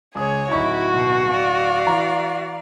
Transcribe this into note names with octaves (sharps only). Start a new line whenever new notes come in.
C#2 G#4 C#5 D#6
D1 D#4 E4 F#4 C#6
B2
D5 F5
E3 A#5